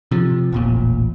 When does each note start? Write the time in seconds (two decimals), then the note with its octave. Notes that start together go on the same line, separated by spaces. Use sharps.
0.11 C3 F3
0.52 E1 A1 A#2